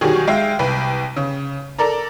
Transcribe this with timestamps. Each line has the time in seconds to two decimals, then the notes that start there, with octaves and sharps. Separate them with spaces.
0.01 B2 D#3 F#3 G3 G4 G#4
0.27 G#3 E5 F5 G5
0.59 C2 B4 G5
1.16 C#3
1.79 A4 A#4 D5 A#5